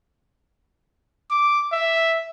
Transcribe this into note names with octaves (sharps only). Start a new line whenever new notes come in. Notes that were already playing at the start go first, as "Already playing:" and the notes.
D6
E5